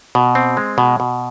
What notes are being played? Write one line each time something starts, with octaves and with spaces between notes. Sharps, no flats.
B2
C4
G#3
B2
B2